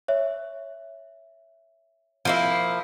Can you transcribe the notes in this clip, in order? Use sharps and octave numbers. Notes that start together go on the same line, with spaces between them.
C#5 E5
F3 A#3 E4